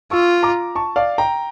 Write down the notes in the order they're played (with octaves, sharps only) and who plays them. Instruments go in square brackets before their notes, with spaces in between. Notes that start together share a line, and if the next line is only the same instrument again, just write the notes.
[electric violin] F4 [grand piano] C#6 E6
[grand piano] A#5 D6
A5 C#6
D5 F5
G5 A#5